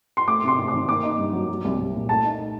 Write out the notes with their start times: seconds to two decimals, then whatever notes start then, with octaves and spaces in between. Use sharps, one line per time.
0.17 C6
0.27 A3 D6
0.44 C3 C6
0.58 C3
0.68 D6
0.74 D#3
0.88 A#3 D6
1.03 D#4
1.18 G2
1.33 F#3
1.49 F#3
1.64 C2
1.78 C2
1.94 A#2
2.09 A3 A5
2.24 D#4